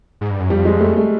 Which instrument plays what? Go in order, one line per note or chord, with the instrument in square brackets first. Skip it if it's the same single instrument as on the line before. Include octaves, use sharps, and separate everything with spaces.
[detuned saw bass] G#2
G2
F#2
[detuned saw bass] F2 [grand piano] G3
[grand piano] G#3
A3
A3